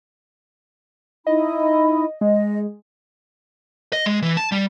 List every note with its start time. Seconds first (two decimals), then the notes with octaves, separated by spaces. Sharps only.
1.27 D#4 E4 D#5 B5
2.21 G#3 D#5
3.93 D#5
4.06 G#3
4.22 E3
4.37 A5
4.52 G3